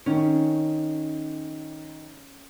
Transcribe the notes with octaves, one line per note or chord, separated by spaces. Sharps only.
D#3 C#4